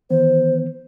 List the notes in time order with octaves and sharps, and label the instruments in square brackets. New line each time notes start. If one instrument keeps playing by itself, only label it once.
[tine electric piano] D#3 E3 B3 [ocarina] C5